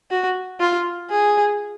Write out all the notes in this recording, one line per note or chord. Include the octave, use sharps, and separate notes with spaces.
F#4
F4
G#4